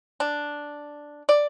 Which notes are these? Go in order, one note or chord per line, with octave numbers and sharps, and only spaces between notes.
D4
D5